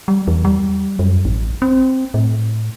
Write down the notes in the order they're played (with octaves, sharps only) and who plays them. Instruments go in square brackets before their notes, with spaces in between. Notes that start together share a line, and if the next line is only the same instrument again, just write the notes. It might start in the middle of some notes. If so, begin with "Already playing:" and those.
[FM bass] G3
E2
G3
F#2
A1
C4
A2